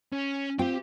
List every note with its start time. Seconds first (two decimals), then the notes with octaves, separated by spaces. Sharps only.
0.12 C#4
0.59 C4 F4 G4 G5